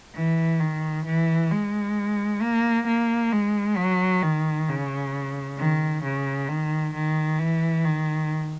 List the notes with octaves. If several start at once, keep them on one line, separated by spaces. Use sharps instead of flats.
E3
D#3
E3
G#3
A#3
A#3
G#3
F#3
D#3
C#3
D#3
C#3
D#3
D#3
E3
D#3